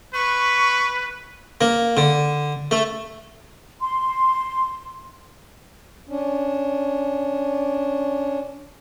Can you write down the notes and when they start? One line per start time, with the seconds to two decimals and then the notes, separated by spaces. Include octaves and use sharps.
0.14 B4 C#6
1.61 A#3
1.97 D3
2.71 A3
3.81 C6
6.09 C#4 D4